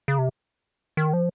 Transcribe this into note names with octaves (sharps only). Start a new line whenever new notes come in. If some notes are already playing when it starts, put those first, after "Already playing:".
C#3
C3
D#3
F3